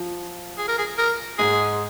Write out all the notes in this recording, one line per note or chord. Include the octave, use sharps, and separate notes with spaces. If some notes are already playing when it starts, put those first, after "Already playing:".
Already playing: F3
G#4
A#4
G#4
A#4
G#2 G#3 G#4